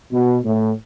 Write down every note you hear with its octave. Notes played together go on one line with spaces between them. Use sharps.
B2
A2